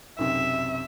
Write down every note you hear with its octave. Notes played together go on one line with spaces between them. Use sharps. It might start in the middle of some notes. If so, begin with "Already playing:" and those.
B1 F#2 C3 E5